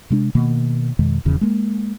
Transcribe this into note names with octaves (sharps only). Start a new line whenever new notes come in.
C3 G#3 D4
B2 D#3 A#3
F2 B2 D#3 G#3
D#1 E2 C#3 F3
G#3 A#3